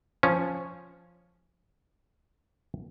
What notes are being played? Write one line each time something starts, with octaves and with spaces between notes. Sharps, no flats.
F3 C#4